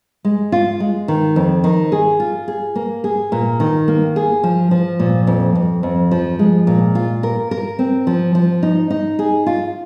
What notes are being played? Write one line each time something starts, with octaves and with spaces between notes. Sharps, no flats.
G#3
F4
G#3
D#3
F2
D#3
G#4
F4
G#4
A#3
G#4
A#2
D#3
A#3
G#4
F3
F3
A#2
F2
F2
F2
F3
G#3
A#2
F4
A#4
A#4
C4
F3
F3
D#4
D#4
G#4
F4